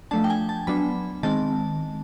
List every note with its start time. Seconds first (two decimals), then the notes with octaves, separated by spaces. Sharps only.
0.11 F3 A3 D4 A5
0.24 G5
0.30 G#5
0.49 A5
0.67 F#3 B3 D4 B5
1.23 D#3 G#3 C4 A5